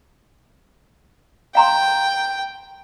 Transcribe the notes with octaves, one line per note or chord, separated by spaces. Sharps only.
F5 G5 A#5 C6